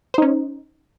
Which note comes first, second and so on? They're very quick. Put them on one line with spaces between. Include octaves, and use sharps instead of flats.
C5 D#4 C#4